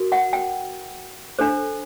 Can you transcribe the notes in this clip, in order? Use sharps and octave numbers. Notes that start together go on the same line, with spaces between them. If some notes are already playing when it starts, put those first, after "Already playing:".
Already playing: F#4 A#4
F#5
G5
D4 A4 C5